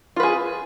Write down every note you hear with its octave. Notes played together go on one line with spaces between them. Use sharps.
F4 G#4 B4